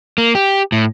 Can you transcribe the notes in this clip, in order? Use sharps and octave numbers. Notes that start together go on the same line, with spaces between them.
A#3
G4
A2